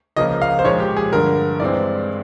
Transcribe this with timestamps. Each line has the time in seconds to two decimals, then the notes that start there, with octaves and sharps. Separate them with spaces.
0.16 C#2 C#3 F3 A#3 D#5
0.42 F5
0.59 C5
0.64 A#2 F3 G#3 C#5
0.80 G4
0.97 G#4
1.12 G2 D3 F3 A#4
1.60 G2 E3 G#3 C4 D5